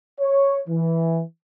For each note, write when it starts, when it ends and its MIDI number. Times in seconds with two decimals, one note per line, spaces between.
0.21 0.59 73
0.69 1.21 52